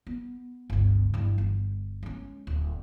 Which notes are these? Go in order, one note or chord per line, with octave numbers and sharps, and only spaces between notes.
B3
G1 C#2
G2 E3
G1
G#3 C#4
D1